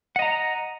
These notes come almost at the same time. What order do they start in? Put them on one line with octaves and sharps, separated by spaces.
F#5 D#5 A#5